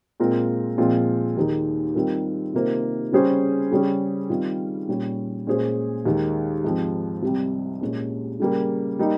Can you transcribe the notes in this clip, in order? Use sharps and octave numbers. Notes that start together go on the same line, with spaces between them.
A#2 G#3 C4 F4 A#4
A#2 F3 G#3 C4 F4
D#2 D#3 A#3 D#4 G#4
D#3 G3 C4 F4 A#4
C3 D#3 A#3 F4 C5
C#3 G3 C#4 G#4 C5
C#3 G3 C#4 G#4
D#3 G3 C4 F4
A#2 G3 C#4
A#2 G#3 C#4 G#4 C5
D#2 D#3 G#3
G#2 F3 C4
C2 C3 G3 C4
A#2 G#3 C#4
C#3 G3 A#3
G3 A#3 D#4